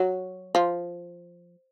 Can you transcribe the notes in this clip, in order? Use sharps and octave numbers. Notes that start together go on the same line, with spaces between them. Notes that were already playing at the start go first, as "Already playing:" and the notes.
Already playing: F#3
F3